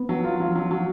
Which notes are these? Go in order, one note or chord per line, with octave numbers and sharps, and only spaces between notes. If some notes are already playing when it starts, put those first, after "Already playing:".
Already playing: B3
F#3
F4
F#3
F#3
F#3